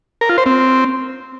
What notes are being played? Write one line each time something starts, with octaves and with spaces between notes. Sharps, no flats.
A#4
F4
C5
C4